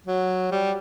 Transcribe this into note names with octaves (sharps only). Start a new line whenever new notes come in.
F#3
G3